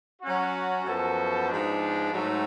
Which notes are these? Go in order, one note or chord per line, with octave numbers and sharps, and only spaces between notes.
F#3 C#4 F#4
F#2 F3 B3 F#4 A4
G#2 F3 G#3 B3 D4
G#2 F#3 A3